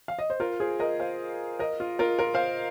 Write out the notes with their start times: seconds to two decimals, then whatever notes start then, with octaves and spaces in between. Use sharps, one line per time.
0.08 F5
0.19 D#5
0.30 C5
0.40 F4 A#4
0.60 G#4 C5
0.80 A#4 D#5
1.00 C5 F5
1.59 A#4 D#5
1.80 F4
1.99 F4 A#4
2.19 F4 A#4
2.34 C5 F5